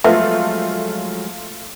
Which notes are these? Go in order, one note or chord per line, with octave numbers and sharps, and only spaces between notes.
F3 F#3 G#3 A3 B3 F4 E5